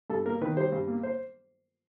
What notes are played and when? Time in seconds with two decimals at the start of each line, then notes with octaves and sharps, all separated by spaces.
0.10 G2 A4
0.25 A#3 A#4
0.41 D#3 B4
0.57 G3 C5
0.72 G2
0.87 A#3
1.03 C5